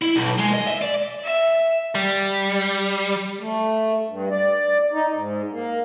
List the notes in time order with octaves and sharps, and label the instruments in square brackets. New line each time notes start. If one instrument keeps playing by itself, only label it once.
[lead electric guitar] E4
B1
G#3
D#5
E5
D5
[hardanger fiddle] E5
[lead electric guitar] G3
[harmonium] A3
G2
D5
D#4
G#2
A#3